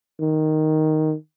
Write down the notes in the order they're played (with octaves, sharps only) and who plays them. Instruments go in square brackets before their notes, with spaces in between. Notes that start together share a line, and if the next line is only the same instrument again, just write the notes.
[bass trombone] D#3